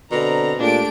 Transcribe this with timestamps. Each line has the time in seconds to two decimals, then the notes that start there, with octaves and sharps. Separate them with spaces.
0.12 B2 D3 C4 A#5
0.59 A#2 G#3 A3 D4 G4 D7